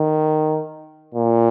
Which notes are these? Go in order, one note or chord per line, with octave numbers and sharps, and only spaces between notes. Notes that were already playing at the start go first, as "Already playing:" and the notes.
Already playing: D#3
A#2